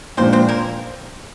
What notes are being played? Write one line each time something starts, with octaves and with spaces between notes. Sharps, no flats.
A#2 F3 G#3 C4 D4 C5
C4 C5
A#3 A#4